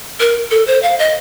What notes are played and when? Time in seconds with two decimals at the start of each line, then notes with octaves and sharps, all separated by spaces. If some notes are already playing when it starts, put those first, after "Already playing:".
0.20 A#4
0.51 A4
0.67 C5
0.83 F5
0.99 D#5